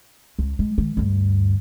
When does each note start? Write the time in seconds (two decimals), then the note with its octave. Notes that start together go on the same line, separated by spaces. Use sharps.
0.39 C#2
0.59 G#3
0.78 D#3 G#3
0.97 D2 G2